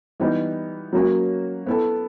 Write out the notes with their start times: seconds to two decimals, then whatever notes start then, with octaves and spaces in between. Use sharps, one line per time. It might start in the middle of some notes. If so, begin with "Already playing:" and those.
0.20 E3 G3 B3 D#4
0.93 F#3 A#3 C#4 F#4
1.66 B3 E4 A4